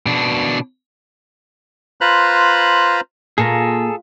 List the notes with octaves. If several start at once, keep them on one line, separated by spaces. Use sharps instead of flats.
B2 D4
F4 B4 C5 A#5 B5 F#6
A#2 G#4 A4 A#5